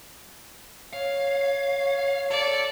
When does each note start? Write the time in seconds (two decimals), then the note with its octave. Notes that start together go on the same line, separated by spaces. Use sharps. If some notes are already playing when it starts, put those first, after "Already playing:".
0.93 C#5 F5
2.31 A4 D5